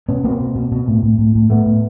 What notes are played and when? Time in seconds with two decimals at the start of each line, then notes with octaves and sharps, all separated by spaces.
0.09 B2 B3 C#4
0.24 B2 A#3 C4
0.40 B2
0.56 B2
0.72 B2
0.88 A2
1.03 A2
1.19 A2
1.35 A2
1.50 A2 A3 B3
1.66 A2